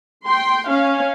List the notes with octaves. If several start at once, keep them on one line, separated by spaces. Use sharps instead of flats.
G5 C6
C#4 F5